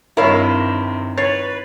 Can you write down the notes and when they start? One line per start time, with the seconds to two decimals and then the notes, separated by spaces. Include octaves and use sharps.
0.17 G2 C3 D#3 E4 A#4 C#5 F5
1.18 B4 C#5 A6 C7